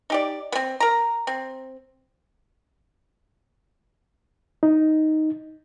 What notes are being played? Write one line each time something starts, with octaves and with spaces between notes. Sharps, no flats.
D#4 G4 D5
B3 C4
A#4 A#5
C4
D#4